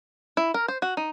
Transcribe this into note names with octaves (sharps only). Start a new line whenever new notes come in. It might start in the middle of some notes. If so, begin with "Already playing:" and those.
E4
A#4
C5
F#4
D#4